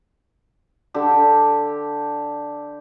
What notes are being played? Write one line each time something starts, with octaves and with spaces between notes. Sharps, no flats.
D3 G4